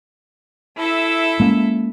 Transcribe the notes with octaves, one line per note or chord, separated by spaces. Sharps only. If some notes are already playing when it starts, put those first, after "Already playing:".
E4 A4 E5
G#3 A#3 C#4